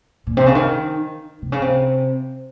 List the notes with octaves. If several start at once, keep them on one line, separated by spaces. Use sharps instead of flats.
A#2
C3
C#3
D#3
C3
C#3
C3